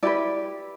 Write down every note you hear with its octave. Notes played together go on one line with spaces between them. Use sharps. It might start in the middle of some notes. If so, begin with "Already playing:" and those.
E4 G4 B4 D5